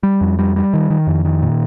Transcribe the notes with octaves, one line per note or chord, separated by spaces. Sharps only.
G3
F2
G3
G3
D#3
D#3
F2
D#3
A#2